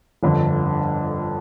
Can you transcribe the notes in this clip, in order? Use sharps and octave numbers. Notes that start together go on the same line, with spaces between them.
G1 F2 D3